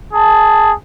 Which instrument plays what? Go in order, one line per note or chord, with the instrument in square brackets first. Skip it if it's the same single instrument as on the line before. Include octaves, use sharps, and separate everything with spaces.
[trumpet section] G#4 A5